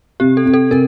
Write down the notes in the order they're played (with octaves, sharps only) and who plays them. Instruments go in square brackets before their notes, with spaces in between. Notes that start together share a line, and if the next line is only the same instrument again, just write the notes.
[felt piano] C3 [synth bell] G4
[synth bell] A4
[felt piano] C3
[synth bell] A4
[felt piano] C3 [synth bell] A#4